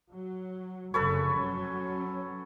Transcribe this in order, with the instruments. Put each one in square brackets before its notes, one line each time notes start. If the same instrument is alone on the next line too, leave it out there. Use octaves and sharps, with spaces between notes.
[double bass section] F#3
[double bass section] F1 F#2 C#3 [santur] A4 B4 C#5
[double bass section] F#3 C#4